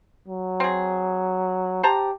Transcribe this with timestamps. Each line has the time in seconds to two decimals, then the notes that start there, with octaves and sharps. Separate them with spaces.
0.28 F#3
0.60 C4 G#4
1.83 G4 C5 A5 A#5